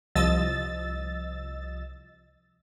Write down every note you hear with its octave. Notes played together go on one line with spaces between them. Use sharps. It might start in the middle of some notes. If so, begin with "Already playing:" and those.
C2 F3 D#5 E6 A6